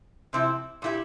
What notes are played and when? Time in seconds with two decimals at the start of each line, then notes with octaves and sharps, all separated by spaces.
0.33 C3 F3 C4 E4
0.82 A#2 A3 E4 G4